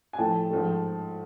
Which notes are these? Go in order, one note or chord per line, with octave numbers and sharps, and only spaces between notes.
G#5
A2 F3 A3 G5 A5
G#2 F3 A3